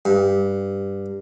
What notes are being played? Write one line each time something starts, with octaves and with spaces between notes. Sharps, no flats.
G2